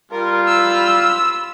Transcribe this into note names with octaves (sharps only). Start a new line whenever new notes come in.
G3 F4 A#4
B5 E6